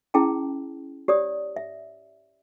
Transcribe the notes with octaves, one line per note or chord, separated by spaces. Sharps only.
C#4 E4 G#4 G5 A5
G4 C#5 D5 D#6
E5